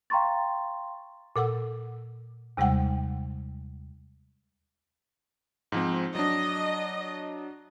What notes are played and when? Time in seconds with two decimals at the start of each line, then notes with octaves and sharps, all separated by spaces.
0.10 F5 G5 A#5 C6 C#6 A6
1.36 A#2 A4 F#5 E6
2.57 D#2 C3 G3 G#3 F#5 G5
5.72 G#2 F3 C4
6.15 F#3 D4 D#5